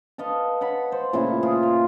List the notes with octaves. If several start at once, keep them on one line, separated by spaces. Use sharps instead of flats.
A4 B4 D#5 F5
C#5 F#5 A5 B5
C5
A#2 C#3 A3 E4
F4 G#4 A#4
F5